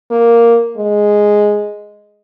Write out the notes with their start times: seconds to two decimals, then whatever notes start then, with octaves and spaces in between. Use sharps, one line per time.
0.11 A#3
0.77 G#3